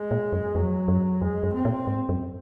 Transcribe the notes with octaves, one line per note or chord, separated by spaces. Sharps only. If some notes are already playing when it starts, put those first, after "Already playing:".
Already playing: G#3
A#2
F#2
F2 F#3
F#2
F2 G#3
F#2
C4
A#2
G#2
F#2